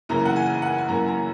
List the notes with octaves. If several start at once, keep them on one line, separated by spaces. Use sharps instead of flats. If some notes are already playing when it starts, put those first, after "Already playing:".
F#2 C#3 E3 A#3 A#5
F#5
G#5
F#5
G#5
F#2 C#3 E3 A#3 A#5
A#5